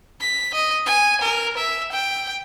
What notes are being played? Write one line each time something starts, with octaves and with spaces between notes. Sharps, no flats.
B6
D#5
G#5
A#4
E5
G5